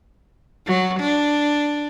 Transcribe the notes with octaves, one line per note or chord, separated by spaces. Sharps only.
F#3
D4